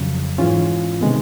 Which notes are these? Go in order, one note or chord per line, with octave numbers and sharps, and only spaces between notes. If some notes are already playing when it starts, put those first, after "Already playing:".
Already playing: F2 C#3 F#3
G#2 E3 G#3 C#4 F4
C3 D#3 G#3 B3